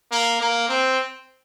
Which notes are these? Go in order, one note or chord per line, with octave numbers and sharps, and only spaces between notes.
A#3
A#3
C4